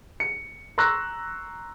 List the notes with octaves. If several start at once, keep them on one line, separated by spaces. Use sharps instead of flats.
C#7
A#5 C6 C#6 E6 F#6 A#6